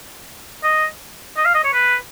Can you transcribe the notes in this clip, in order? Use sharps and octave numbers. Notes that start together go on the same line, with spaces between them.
D#5
D#5
F5
D#5
C#5
B4